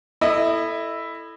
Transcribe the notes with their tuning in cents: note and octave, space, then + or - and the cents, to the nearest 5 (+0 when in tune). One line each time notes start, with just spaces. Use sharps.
E4 +0 A4 +0 D#5 -25